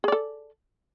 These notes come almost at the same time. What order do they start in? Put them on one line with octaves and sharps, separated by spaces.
G#4 D5 A4